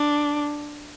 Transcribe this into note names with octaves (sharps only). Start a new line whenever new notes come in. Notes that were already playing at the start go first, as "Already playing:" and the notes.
Already playing: D4